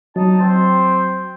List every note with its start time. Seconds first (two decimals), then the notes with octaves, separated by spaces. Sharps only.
0.16 F#3 D#4 A5
0.39 C4 C5